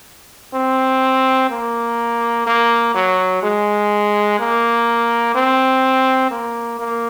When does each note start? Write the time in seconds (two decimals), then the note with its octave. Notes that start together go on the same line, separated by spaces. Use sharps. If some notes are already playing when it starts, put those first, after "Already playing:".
0.54 C4
1.50 A#3
2.46 A#3
2.95 F#3
3.43 G#3
4.39 A#3
5.35 C4
6.31 A#3
6.79 A#3